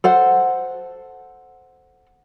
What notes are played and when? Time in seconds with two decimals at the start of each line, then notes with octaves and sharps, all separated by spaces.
0.04 A4 C5 F#5